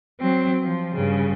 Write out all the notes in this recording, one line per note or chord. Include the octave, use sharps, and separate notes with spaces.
F#3 C4
F3
G2 C#3